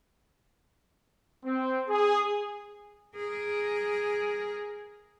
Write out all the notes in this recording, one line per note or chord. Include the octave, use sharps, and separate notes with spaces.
C4
G#4
G#4 A#4